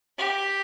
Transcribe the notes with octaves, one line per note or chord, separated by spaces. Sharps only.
G4